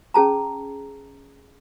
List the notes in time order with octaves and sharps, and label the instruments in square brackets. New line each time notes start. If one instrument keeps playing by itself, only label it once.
[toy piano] C#4 G#4 A5 A#5